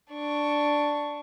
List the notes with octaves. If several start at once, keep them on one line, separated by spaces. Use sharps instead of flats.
D4 C#6